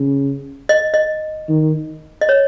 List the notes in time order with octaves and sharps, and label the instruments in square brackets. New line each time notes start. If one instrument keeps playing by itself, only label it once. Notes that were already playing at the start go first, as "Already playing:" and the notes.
Already playing: [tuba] C#3
[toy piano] D#5
D#5
[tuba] D#3
[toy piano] D#5
C#5